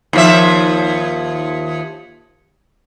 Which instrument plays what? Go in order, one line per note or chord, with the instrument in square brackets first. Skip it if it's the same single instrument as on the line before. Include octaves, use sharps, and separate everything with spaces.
[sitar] D#2 F3 E5